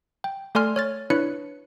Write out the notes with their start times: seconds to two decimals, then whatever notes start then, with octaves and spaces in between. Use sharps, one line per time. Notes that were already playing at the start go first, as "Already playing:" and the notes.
0.24 G5
0.55 A3 A4 D5 G#5 C6 F6
0.76 C#5 F6 A6
1.10 D4 E4 B4 C#5 F#6 C#7